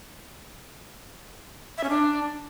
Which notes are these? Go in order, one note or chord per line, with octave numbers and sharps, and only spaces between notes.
E5
C#4
D4